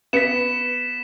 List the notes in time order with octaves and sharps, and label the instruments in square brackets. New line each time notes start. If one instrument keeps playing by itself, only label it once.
[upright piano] B3 C#7 [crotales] B6 E7